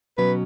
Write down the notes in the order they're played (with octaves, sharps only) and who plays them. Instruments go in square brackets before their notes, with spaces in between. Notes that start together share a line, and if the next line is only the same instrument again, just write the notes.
[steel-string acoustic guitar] B2 F#3 C#4 [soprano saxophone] B4